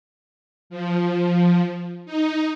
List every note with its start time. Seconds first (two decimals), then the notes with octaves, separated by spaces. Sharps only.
0.70 F3
2.06 D#4